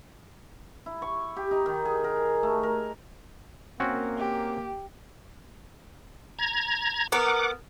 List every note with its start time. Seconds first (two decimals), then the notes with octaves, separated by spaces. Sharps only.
0.86 E4
1.02 C#6
1.36 G4
1.51 D#4
1.66 D#3
1.85 G#4
2.04 A#4
2.43 A3
2.63 A#4
3.80 A#3 C4 C#4 F#4
4.18 G4
6.39 A#5 G#6
7.12 B3 A#4 F#5 D6